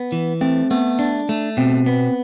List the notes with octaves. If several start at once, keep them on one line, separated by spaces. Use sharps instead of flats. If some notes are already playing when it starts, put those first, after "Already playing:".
Already playing: B3
E3
A3 C4
A3 B3
D4
A3
B2 C4
B3